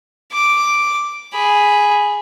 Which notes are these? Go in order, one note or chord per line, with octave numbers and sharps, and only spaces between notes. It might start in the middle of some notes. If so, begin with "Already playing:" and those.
D6
G#4 B5